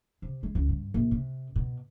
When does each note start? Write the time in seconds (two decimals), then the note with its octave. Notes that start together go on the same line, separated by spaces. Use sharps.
0.22 C3
0.43 G#3
0.55 C#2
0.69 G2
0.94 A#1
1.11 C3
1.56 B2